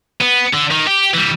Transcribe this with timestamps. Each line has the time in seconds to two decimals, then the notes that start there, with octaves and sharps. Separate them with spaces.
0.21 B3
0.54 D3
0.71 D#3
0.87 G4
1.14 E3 G3